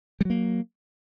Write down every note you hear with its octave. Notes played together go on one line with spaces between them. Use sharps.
F#3 G3 A#3